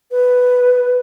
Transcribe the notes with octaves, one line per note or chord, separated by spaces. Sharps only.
B4